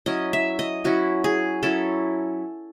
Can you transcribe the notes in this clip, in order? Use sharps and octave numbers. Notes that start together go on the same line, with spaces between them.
F#3 C#4 E4 D#5
E5
D#5
F#3 C#4 E4 F#4
G#4
F#3 C#4 E4 A4